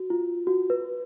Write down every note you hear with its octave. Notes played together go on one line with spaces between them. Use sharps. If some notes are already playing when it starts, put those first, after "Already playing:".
Already playing: F#4
F4
F#4
B4